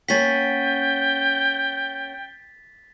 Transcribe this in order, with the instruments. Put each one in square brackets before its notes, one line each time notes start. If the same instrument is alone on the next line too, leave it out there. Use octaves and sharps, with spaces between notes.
[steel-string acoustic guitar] A#3 C#4 F#5 [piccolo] G5 [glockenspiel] A6 B6